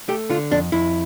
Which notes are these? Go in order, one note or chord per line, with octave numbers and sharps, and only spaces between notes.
A3 G4
D3 F4
F2 D4
F2 E4